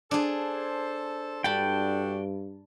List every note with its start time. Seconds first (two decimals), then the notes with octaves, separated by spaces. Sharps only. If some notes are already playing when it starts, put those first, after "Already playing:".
0.11 D4 G#4 A4 C5
1.44 G2 D4 F#4 A4 G5 A5 B5